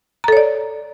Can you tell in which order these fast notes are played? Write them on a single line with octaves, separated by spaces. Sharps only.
A#5 A4 C#5 D5